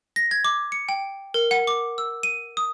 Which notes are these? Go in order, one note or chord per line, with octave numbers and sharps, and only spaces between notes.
A#6
G#6
D6
C#7
G5
A#4
F#5
D6
E6
D#7
D#6